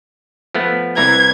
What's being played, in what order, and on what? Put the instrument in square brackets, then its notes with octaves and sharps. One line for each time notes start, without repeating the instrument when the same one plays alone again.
[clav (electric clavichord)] F3 A3 B3
[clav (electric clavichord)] C2 E3 A#5 [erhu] G#6